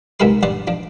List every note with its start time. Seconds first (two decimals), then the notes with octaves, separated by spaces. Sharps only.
0.20 C2 G#2 C3 A#4 B4 C6
0.43 G2 D5 F#5 C6
0.67 F3 D4